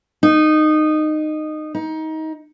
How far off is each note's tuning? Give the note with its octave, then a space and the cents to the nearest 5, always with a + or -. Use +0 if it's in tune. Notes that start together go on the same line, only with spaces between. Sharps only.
D#4 -15
D#4 +25